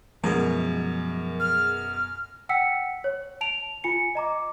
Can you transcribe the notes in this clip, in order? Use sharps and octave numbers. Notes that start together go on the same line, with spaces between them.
F#2 B2 F3 F#3 G#3 G#4 A#4
F6
F#5 G5 E6 B6 C#7
C#5
A5 D7 F7
F4 G#5 C#7
D#5 A#5 D6